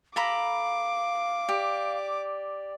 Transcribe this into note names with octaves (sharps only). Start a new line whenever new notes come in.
A4 F5 A#5 B5 D6
G4 D5